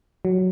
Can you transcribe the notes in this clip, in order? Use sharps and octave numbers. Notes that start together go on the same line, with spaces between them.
F#3